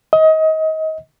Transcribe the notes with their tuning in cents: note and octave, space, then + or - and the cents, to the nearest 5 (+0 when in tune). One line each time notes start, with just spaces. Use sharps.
D#5 +25